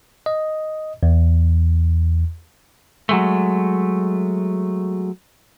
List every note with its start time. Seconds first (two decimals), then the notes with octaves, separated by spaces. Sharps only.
0.26 D#5
1.03 E2
3.09 F#3 G#3 A3